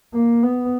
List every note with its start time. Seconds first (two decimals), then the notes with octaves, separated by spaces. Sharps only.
0.13 A#3
0.43 B3